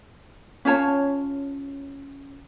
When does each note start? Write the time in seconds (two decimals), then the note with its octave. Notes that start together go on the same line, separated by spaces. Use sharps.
0.65 C#4 F4 C#5 A5